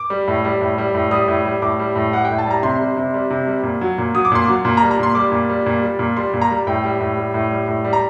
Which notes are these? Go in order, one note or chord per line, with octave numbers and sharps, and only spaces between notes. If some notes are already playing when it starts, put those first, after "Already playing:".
Already playing: D6
G3
A2
G3
A2
G3
A2
G3 D#6
A2
G3
A2 D6
G3
A2
G3 F#5
A2 G5
A5
G3 A#5
C3 C6
G3
C3
G3
C3
G3
A#2
F#3
A#2
F#3 D#6
D6
A#2 C6
F#3 D6
A#2 C6
A#5
G3
A#5
A#2 C6
G3 D6
A#2
G3
A#2
G3
A#2
G3 C6
A#2
A#5
G3
A2 G5
G3
A2
G3
A2
G3
A2
G3
A#5